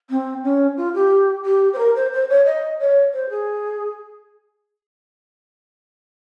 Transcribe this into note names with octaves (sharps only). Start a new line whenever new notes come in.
C4
C#4
F4
G4
G4
C5
A#4
C5
C5
C#5
D#5
C#5
C5
G#4